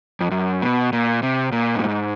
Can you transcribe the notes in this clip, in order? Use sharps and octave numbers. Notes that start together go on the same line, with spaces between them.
F2
F#2
B2
A#2
C3
A#2
G2
G#2